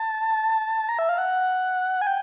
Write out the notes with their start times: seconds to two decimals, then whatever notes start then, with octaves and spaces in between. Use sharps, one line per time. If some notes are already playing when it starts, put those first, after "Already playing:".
Already playing: A5
0.89 A#5
0.99 E5
1.09 F5
1.18 F#5
2.01 G#5
2.07 G5